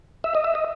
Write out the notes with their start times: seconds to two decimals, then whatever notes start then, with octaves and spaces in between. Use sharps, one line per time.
0.24 E5
0.35 D#5
0.44 E5
0.55 D#5